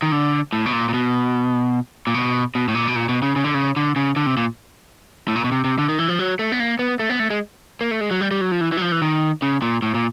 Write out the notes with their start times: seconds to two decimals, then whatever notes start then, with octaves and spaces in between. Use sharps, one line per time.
0.02 D#3
0.12 D3
0.53 A2
0.66 B2
0.72 A#2
0.89 A#2
0.94 B2
2.07 A#2
2.14 B2
2.55 B2
2.68 A2
2.75 A#2
2.88 B2
2.96 A#2
3.09 B2
3.22 C#3
3.36 C#3
3.44 D3
3.54 C#3
3.76 D3
3.96 C#3
4.16 D3
4.26 C3
4.37 A#2
5.28 A2
5.36 A#2
5.44 B2
5.52 C3
5.65 C3
5.78 D3
5.89 D#3
5.99 E3
6.08 F3
6.19 F#3
6.39 A3
6.52 B3
6.60 A#3
6.79 B3
7.00 A3
7.10 B3
7.20 A3
7.30 G#3
7.81 A#3
7.91 A3
8.01 G#3
8.11 F#3
8.21 G3
8.31 G3
8.41 F#3
8.52 F3
8.61 E3
8.72 E3
8.77 F#3
8.82 F3
8.92 E3
9.02 D#3
9.42 C#3
9.62 A#2
9.82 A2
9.95 A#2